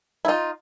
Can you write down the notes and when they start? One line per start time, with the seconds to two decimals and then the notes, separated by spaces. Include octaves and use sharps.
0.25 E4
0.28 D#4 F4